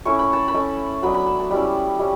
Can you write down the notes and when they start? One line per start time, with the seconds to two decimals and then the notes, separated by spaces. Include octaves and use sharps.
0.05 A3 C#4 E4 C#6
0.19 B5
0.33 A5
0.48 B5
0.54 A3 C#4 E4
1.02 F#3 B3 D4 B5
1.14 B5
1.26 A5
1.39 A5
1.51 G3 C#4 E4 B5
1.99 G3 C#4 E4